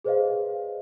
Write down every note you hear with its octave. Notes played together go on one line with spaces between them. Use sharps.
G#4 B4 C5 D5 D#5 F5